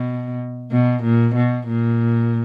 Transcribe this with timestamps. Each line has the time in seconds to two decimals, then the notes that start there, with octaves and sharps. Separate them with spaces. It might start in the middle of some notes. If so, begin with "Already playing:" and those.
Already playing: B2
0.71 B2
1.03 A#2
1.35 B2
1.67 A#2